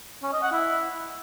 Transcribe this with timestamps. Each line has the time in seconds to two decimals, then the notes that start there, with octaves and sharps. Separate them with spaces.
0.23 C#4
0.33 D#5
0.42 F#5
0.52 E4